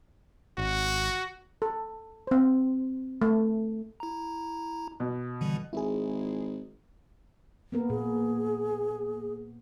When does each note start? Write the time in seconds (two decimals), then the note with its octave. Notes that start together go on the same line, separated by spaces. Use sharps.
0.58 G#1 F#4
1.62 A4
2.27 C4 C5
3.22 A3
4.00 E4 A#5
5.00 B2
5.41 D3 E3 G3
5.73 G#1 E4 G#4
7.72 A#3 B3 A#4
7.90 A#2 G#4